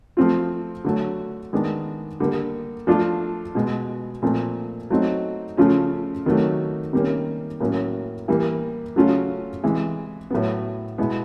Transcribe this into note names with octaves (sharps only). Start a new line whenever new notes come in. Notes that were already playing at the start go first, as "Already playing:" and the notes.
F3 A3 C4 F4
D3 F#3 A3
D#3 G#3 B3 D4
D3 G3 A#3
F3 A3 D4 F4
B2 G#3 B3
A#2 F3 A3 C4
F#3 A3 C4 D#4
C#3 F3 A3 C#4 F4
C3 D#3 F#3 A3
C3 D#3 G3 A#3 C#4
A2 F#3 A#3 C#4
E3 G3 A#3
C#3 F#3 A3 C#4 F4
C3 E3 G#3
A2 F#3 B3
B2 G#3 B3 E4